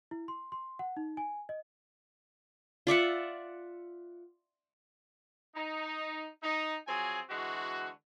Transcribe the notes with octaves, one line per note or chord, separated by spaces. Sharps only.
E4
C6
C6
F#5
D#4
G#5
D#5
F4 D5 E5 F#5
D#4
D#4
F3 F#3 C4 G#4 G#5
D3 E3 G#3 F#4